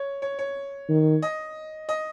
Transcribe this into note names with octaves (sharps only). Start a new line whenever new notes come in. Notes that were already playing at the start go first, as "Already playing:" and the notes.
Already playing: C#5
C#5
C#5
D#3
D#5
D#5